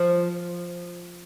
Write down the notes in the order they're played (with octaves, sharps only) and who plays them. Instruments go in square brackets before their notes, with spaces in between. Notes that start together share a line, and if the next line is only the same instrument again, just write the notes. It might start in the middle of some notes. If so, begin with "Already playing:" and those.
Already playing: [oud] F3